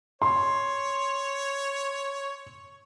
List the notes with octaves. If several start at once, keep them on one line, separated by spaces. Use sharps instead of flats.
C#5 C6